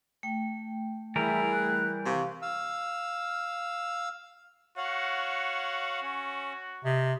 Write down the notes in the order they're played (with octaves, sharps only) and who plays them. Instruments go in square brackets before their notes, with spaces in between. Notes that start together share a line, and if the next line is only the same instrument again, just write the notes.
[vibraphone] A3 G5
[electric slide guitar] E3 G3 A#4 [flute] E4 [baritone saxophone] G#4
[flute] F#6
[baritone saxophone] C3 [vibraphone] F5 [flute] C#6
[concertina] F5 E6
[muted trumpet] F#4 [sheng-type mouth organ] C#5 F5 F#5
[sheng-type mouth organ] C#4
[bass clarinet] C3 [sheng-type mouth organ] D#5